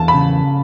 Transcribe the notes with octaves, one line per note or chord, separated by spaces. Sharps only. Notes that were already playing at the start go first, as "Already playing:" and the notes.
Already playing: E2 A5
B5
C#3